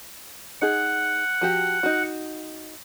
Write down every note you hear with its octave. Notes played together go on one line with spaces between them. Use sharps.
D#4 G#4 F#5
F3 F#4 G4
D#4 F#4